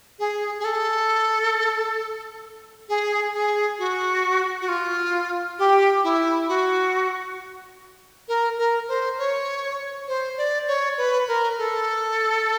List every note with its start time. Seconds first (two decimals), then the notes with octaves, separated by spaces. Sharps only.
0.19 G#4
0.59 G#4
0.64 A4
2.89 G#4
3.34 G#4
3.79 F#4
4.61 F#4
4.68 F4
5.59 G4
6.04 E4
6.48 F#4
8.28 A#4
8.58 A#4
8.88 C5
9.18 C#5
10.08 C5
10.38 D5
10.68 C#5
10.97 B4
11.28 A#4
11.58 A4